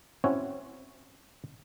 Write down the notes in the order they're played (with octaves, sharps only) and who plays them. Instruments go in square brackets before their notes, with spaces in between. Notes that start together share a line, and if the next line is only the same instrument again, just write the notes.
[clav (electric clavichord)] C4 C#4 E4 F#4 C#5